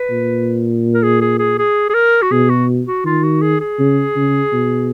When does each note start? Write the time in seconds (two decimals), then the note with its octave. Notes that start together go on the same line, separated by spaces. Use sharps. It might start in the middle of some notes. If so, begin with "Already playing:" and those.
Already playing: B4
0.10 A#2
0.94 A#4
1.03 G#4
1.21 G#4
1.39 G#4
1.58 G#4
1.90 G#4
1.94 A#4
2.22 F#4
2.31 B2 G#4
2.50 F#4
2.87 F#4
3.05 D#3 F4
3.23 F#4
3.42 G#4
3.61 G#4
3.79 C#3
4.16 C#3
4.53 B2